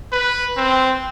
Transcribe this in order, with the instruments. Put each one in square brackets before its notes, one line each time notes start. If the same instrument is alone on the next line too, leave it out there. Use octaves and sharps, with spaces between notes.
[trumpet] B4
C4